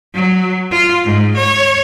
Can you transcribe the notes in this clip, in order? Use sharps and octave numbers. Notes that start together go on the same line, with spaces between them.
F#3
F4
G#2
C#5